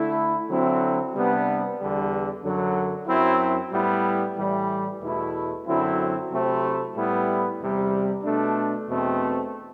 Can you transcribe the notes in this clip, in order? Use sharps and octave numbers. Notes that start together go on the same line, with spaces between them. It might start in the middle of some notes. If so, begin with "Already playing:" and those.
Already playing: D3 A3 E4
D3 F#3 C4 E4
C3 G3 B3 D4
E2 D3 G3
F#2 D3 F#3
F#2 F#3 C4 E4
A2 G3 B3 E4
A2 E3 G3
E2 B2 A3 E4
F#2 D3 F#3 C4 E4
C3 F#3 A3 C4 E4
A2 G3 B3 E4
E2 C3 G3
B2 A3 D4
E2 B2 A3 C4